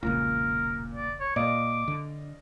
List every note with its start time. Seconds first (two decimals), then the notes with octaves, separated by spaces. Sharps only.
0.03 E1 B1 A#2 C#3 A#4
0.94 D5
1.20 C#5
1.36 A#2 D5 D#5 F5 D6
1.88 D3